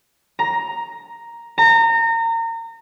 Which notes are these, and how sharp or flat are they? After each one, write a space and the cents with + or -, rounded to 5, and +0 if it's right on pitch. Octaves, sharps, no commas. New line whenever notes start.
A#5 +5
A#5 -30